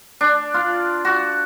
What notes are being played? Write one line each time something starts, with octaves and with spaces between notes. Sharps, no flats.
D4
F4
F#4